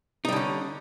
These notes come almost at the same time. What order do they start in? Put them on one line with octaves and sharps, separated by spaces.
D#4 G3 D3 C#4